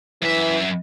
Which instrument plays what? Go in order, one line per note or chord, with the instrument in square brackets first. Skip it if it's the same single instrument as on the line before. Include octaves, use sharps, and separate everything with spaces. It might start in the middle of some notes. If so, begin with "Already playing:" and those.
[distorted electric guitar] F#2 E5 [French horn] E3